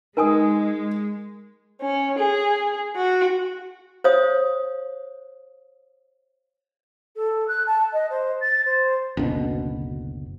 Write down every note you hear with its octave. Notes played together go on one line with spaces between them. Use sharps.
G#3 D#4 A#4 G#5 D#6
C#4
G#4
F#4
C5 C#5 F5 D#6
A4
F#6
A5
D#5
C5
A6
C5
F#1 D2 B2